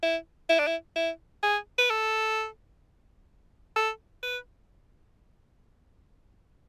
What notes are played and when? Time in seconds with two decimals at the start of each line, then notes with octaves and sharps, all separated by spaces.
0.03 E4
0.49 E4
0.59 D4
0.67 E4
0.96 E4
1.43 G#4
1.78 B4
1.90 A4
3.76 A4
4.23 B4